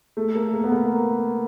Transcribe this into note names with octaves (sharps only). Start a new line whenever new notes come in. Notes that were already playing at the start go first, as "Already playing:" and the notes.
A3
A#3
A#3
B3
A#3